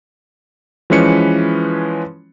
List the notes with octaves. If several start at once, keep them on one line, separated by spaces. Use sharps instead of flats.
E3 F3 G#3 C#4 B4 C#7